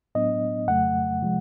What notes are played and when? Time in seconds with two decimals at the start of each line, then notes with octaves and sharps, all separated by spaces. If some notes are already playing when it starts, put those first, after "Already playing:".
0.15 A2 F#3 B3 D4 D#5
0.68 F2 C#3 F#3 A3 F#5
1.22 C3 F3 G#3